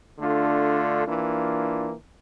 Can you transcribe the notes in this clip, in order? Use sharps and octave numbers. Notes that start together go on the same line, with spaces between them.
D3 A3 D4 F4
E3 A#3 D4 F4